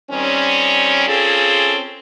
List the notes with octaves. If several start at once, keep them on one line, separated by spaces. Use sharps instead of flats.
D#3 G3 C4 C#4
C4 C#4 F4 G#4 A4